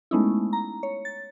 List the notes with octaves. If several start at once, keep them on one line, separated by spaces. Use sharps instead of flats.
G#3 A3 B3 C#4 D#4 E4
A#5
C#5
A6